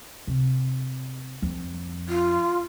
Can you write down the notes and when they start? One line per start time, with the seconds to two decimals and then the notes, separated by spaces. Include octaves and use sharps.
0.27 C3
1.42 F2
2.09 F4